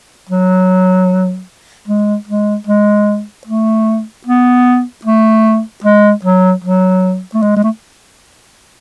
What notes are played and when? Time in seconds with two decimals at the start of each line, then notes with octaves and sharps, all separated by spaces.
0.29 F#3
1.88 G#3
2.27 G#3
2.67 G#3
3.47 A3
4.26 B3
5.05 A3
5.84 G#3
6.24 F#3
6.64 F#3
7.34 A3
7.42 G#3
7.56 G#3
7.63 A3